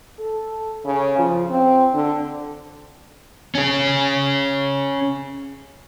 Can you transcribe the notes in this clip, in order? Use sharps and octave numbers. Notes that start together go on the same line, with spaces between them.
A4
C#3
F3
C4
D3
C#4 G#4